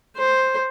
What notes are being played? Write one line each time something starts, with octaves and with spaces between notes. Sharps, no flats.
C5